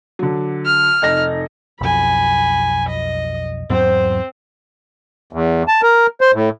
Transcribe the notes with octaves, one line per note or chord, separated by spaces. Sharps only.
D3 F#3
F6
F1 D#4 A#6
B1 F2 G#5 B5
D#5
E2 G#2 F#3 C4 C5
E2
A5
A#4
C5
A2